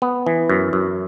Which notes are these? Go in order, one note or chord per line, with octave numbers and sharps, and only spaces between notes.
B3
E3
F#2
F#2